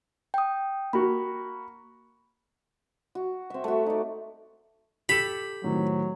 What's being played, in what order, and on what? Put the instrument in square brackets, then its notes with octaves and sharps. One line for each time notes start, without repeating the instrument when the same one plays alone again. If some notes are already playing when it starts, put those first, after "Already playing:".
[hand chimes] G5 D#6
[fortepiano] A#3 F#4 [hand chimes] B5
[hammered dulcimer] F#4
C4 E5
A3 F#4
D#4 D5
[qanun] G4 A4 [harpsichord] B5
[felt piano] A2 D#3 C4 [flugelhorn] F#3